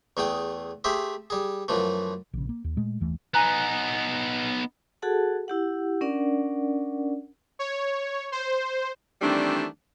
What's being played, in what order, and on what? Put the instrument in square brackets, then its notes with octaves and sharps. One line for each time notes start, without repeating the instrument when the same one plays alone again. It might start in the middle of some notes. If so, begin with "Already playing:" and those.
[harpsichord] E2 A3 G#4 G5 D#6
A3 G4 G#4 C5 E5
G3 G#4
F#2 E3 F3 A3
[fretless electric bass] A#1 C#3
A#3
D#2
A#2 G#3 A3
F#1 D#2 E3 A3
[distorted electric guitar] B3 D#4 [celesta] G#5 A#5 F#6
[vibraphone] F#4 G#4 A4 F#5 A5
E4 G4 F#5
C#4 D4 A#4 D5 F#5
[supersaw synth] C#5
C5
[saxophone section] D#3 E3 G3 A3 C4 D4